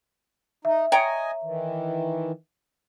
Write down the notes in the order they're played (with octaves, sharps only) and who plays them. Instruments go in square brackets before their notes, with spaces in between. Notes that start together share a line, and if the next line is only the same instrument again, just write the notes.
[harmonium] D#4 [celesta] E5
[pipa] C#5 G5 A#5 [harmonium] D#5 G#5
[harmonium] D#3 E3